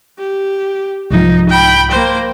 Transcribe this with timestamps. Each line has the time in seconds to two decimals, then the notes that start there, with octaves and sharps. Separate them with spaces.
0.18 G4
1.11 C2 G#2 F3 D#4
1.49 G5 B5
1.91 A#3 C5